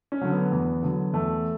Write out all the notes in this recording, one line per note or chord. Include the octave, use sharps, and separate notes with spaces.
C#4
D3 F#3
B3
E2
D3 F#3
E2 A3